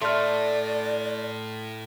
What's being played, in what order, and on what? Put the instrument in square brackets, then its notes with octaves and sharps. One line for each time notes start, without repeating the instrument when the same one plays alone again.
[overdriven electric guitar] A2 [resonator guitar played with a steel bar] A3 [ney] D5 [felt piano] C6 F6